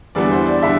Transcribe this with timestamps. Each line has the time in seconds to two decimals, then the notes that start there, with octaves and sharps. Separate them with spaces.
0.15 E2 D3 G3 B3 E4 D5
0.31 C5
0.47 D5
0.63 D3 G3 E5